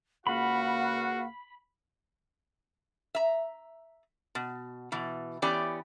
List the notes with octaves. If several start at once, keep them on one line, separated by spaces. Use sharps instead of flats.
C#2 A#3 F#4 F5 F#5 B5
E5 A#5
B2
B2 E3
E3 B3 C#4 G4 D5